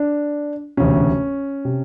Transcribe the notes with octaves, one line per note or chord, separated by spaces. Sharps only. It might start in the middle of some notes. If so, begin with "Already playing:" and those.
Already playing: D4
E1 D2 C3 C#4
C3